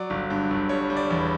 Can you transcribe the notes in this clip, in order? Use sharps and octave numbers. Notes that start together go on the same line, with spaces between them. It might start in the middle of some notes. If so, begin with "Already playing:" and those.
Already playing: F#3 D5
G1
G2
G1
G3 C#5
G3
D5
E2